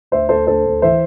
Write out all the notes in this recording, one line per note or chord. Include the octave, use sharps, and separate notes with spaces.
D2 C5 E5
D2 A4 C5
D2 A4 C5
D2
E3 C5 E5